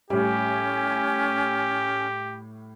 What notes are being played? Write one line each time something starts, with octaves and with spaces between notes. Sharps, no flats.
A2 G3 C#4 G4 G#5